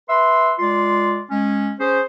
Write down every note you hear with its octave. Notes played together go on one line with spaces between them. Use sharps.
B4 E5 C6
G#3 F4 D5 C6
G#3 C#4
C#4 G#4 C5